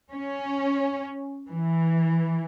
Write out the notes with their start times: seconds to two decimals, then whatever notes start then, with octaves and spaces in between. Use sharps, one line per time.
0.12 C#4
1.52 E3